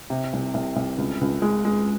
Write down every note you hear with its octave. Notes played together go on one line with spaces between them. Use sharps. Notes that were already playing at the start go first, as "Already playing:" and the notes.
C3
C2
C2
C2
C#2
C#2
G#3
G#3